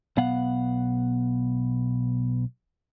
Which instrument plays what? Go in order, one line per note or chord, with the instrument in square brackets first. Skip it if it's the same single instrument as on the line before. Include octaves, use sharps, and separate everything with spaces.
[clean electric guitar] B1 B3 F5 F#5